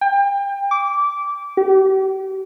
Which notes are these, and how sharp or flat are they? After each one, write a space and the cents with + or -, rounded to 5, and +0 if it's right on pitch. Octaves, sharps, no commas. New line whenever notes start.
G5 +30
D6 -20
G4 -40